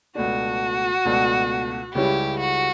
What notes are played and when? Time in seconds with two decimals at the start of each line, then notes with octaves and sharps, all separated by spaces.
0.15 C#2 B2 A3 D4 F#4
1.05 C#2 B2 A3 D4
1.95 C#2 C#3 G3 C#4 E4 G4
2.39 F#4